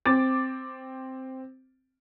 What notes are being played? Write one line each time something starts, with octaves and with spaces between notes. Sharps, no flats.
C4 D6 A6